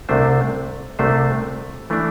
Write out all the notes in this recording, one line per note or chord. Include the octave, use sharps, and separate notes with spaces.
C2 C3 A3 D4 C5
C2 C3 A3 D4 C5
E3 A3 D4